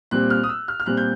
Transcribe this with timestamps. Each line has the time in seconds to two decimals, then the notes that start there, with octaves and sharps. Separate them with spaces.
0.11 A#2 G3 C4 F#6
0.30 F6
0.43 D#6
0.49 E6
0.68 F6
0.80 F6
0.86 A#2 G3 C4 F#6
0.97 G6